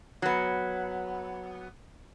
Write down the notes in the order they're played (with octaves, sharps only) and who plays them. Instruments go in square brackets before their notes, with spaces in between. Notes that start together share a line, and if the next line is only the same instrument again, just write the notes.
[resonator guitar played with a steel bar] F#3 B3